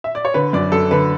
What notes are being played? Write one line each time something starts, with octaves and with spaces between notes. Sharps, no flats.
E5
D5
C#5
D3 B4
F#2 D5
F#2 A4
D3 B4